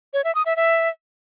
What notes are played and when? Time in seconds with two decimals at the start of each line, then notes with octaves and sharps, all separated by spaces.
0.14 C#5
0.24 E5
0.35 D#6
0.46 E5
0.56 E5